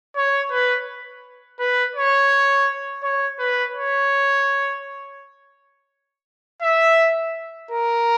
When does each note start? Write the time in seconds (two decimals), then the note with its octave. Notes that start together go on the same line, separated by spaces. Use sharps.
0.16 C#5
0.51 B4
1.59 B4
1.95 C#5
3.03 C#5
3.39 B4
3.75 C#5
6.62 E5
7.71 A#4